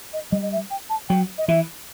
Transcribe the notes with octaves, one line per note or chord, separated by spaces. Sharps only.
D#5
G3 D#5
D#5
E5
G5
A5
F#3 G5
D#5
E3 E5